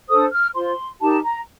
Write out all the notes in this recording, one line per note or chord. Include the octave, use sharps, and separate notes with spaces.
D4 A4 C5 D#6
F6
F4 C5 C6
D#4 G4 A#4 A5
A#5